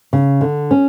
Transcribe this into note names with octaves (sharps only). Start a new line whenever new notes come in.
C#3
D3
C#4